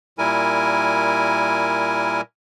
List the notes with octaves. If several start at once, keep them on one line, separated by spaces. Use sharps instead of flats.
A#2 G3 E4 A#4 G#5